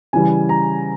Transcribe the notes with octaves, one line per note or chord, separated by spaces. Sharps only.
C#3 E3 G3 G#5
A#5